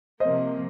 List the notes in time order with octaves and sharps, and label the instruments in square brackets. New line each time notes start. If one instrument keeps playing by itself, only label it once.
[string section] C3 F3 A#3 [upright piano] C5 D#5